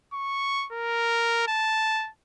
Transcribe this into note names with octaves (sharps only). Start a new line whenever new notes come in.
C#6
A#4
A5